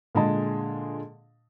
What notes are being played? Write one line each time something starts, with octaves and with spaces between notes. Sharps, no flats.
A#2 D3 G#3 G#4 D#5 A5